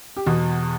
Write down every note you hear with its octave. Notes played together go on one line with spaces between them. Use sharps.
G4
E2 B2 F#4